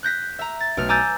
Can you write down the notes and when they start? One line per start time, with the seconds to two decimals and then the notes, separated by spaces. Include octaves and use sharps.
0.03 F#6 G6 A#6 B6
0.39 E5 A#5
0.60 A6
0.77 B1 A3 F6
0.89 G#5 A#5 D6 E6 G6 A6